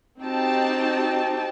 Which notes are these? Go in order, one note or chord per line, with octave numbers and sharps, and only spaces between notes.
C4 D#4 F#4 G4 G5 A5